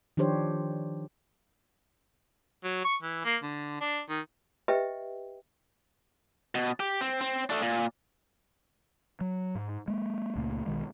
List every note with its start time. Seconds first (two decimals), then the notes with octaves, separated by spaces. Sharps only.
0.17 D#3 F3 D4 G4 C5 C#5
2.64 F#3
2.85 C#6
3.03 E3
3.25 A#3
3.43 D3
3.81 D4
4.09 D#3
4.68 G4 B4 D#5 E5 G5
6.55 B2
6.80 G4
7.01 C4
7.21 C4
7.50 A3 D4
7.62 A#2
9.21 F#3
9.55 G#2
9.88 G#3 A#3
10.35 C#2 A#2 A3 A#3
10.66 B1 B2 D#3 G#3